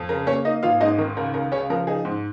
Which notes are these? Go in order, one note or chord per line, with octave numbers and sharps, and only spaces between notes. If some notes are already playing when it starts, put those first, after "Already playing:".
Already playing: F2
C#3 A#4
A#3 C#4 C#5
A#3 D#4 D#5
G#1 F4 F5
G#2 D#4 D#5
D#3 A#4
C#2 A#4
C#2 A#4
C#3 C#4 C#5
F3 A#4
D#4 G#4
G#2